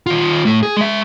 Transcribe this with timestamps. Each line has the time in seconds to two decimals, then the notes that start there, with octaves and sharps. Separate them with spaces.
0.06 D#3 F4
0.45 A2 A3
0.63 G#4
0.77 G#3 E5